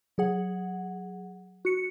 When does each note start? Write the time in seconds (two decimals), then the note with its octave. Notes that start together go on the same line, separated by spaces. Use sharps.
0.18 F#3 G#4 F#5
1.65 F#4 C#7